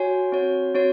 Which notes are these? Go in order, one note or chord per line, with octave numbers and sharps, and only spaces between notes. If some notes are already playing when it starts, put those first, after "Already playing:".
Already playing: F#4 C#5 G#5
C4 F#4 C#5
C4 F#4 C#5